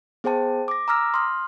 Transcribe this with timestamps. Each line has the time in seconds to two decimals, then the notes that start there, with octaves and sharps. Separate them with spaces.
0.24 B3 G#4 C5 G5 A5
0.68 D6 A#6
0.88 A#5 D6 E6 F6 A#6
1.14 C6 D#6 F6